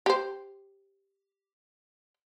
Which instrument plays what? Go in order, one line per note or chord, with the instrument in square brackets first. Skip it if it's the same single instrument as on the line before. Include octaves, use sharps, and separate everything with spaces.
[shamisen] G4 C5